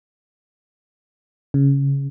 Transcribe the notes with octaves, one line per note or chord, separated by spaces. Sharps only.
C#3